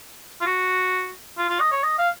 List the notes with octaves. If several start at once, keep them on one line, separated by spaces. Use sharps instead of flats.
F4
F#4
F4
F4
D#5
C#5
D#5
F5